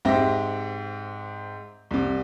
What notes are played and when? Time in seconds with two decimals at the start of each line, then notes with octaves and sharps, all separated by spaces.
0.05 G#2 C4 G4 E5 A#6
1.91 C2 C3